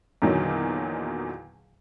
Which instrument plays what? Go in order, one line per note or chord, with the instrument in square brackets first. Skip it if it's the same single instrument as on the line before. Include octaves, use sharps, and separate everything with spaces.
[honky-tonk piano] E2 A#2 D3 D#3 F#3